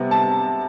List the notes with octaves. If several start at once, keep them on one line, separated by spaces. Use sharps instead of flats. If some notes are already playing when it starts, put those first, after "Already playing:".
Already playing: C3 G3 B3
A5